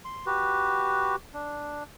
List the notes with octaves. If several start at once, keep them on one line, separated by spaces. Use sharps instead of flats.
C6
F#4 G4 B4
D4